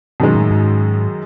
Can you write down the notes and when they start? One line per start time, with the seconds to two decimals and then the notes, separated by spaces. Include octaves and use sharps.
0.20 F#2 B2 D#3 G#3
0.35 A2
0.51 G#2